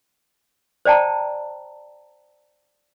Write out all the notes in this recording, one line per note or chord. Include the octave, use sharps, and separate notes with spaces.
C5 D5 G5 A5 A#5